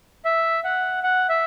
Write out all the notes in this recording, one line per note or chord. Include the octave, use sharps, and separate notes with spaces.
E5
F#5
F#5
E5